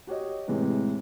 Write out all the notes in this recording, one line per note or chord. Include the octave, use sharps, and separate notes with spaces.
F#4 G4 C#5 D#5
A2 C3 E3 G#3